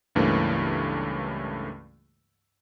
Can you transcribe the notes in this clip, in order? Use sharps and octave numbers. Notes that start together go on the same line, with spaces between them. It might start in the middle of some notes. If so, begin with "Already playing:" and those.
C#2 G2 E3 A3 A#3 C#4